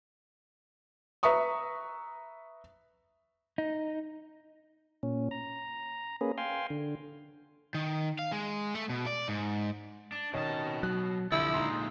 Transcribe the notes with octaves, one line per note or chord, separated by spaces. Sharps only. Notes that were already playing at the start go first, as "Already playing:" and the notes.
B4 E5 A#5 C#6 D#6
D#4
A#2 C#4
A#5
A#3 C#4 G#4 B4
F5 G5 G#5 C6
D3
D#3
F5
G#3
A3
B2
D5
G#2
D4
B2 D#3 C#4 D#5 A5
F#3 F#6
C2 D3 F3 E4
A#2 G#3 D#4 C6